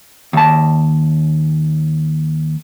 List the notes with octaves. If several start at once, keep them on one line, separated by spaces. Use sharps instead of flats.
D#2 A5